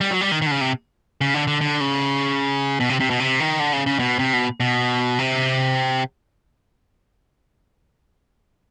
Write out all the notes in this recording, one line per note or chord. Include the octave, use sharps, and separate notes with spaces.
G3
F#3
G3
D#3
D#3
D3
C#3
C3
C#3
D3
D3
D3
C#3
B2
C3
C3
B2
C3
D#3
D3
C#3
C#3
B2
C3
B2
B2
C3